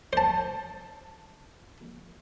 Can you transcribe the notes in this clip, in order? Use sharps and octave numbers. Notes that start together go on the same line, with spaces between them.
C5 A5